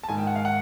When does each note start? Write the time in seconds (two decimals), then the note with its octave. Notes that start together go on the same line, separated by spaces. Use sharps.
0.03 A5
0.08 G#2 D#3 G#5
0.18 G5
0.27 F#5
0.35 F5
0.45 F#5